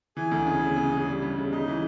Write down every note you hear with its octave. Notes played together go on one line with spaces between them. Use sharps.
E3 G#4 G#5
D2
C#3
C#3
C#3
C#3
G3
C#3
C#3
C#3 D#4 D#5
E3